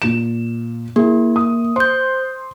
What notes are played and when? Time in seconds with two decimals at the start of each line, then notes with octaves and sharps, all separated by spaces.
0.02 A#2 E7
0.96 A#3 E4 G#4
1.36 D#6
1.76 C5 C6 G6